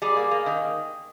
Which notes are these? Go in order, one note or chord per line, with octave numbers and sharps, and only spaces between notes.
G3 G#4
A#3
A#3
D#3